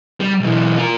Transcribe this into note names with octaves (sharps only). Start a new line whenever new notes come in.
G3
B1 E3
F4 A#4